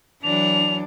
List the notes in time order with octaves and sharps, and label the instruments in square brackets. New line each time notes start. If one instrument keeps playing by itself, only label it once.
[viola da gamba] E3 F#3 [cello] D4 [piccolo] F7